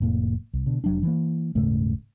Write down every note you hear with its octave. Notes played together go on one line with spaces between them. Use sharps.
F1 A2 A#3
C2
B2 D3
F1 F#3 D4
E3 A#3
D#1 G#2 C#3 A3